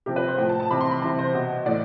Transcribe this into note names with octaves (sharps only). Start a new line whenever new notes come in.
C3 F3 G4
B4
C5
A2 F3 G5
A5
A5
C3 E3 B5
C6
B5
C3 E3 A5
C5
B2
A2 E3 D5